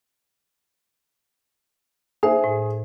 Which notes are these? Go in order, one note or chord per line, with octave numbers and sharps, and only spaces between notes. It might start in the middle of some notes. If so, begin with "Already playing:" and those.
D#4 G#4 C5 E5
A2